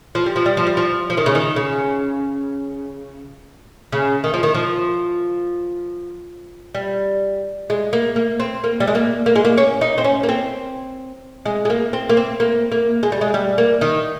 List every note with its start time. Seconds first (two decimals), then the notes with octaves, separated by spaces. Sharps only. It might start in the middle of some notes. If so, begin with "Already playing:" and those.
0.15 F3
0.26 G3
0.36 F3
0.46 G3
0.57 F3
0.67 G3
0.77 F3
1.10 F3
1.17 D#3
1.26 C#3
1.35 D#3
1.56 C#3
3.92 C#3
4.24 D#3
4.34 F3
4.43 D#3
4.54 F3
6.75 G3
7.70 G#3
7.93 A#3
8.16 A#3
8.40 C4
8.64 A#3
8.80 G3
8.87 G#3
8.95 A#3
9.26 A#3
9.36 G#3
9.45 A#3
9.58 C#4
9.81 D#4
9.98 C4
10.04 C#4
10.23 A#3
10.29 C4
11.46 G#3
11.65 G#3
11.70 A#3
11.93 C4
12.09 A#3
12.17 C4
12.40 A#3
12.72 A#3
13.03 G#3
13.12 G3
13.21 G#3
13.34 G3
13.58 A#3
13.81 D#3